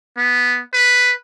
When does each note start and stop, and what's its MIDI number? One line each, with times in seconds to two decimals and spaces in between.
0.17 0.60 59
0.73 1.12 71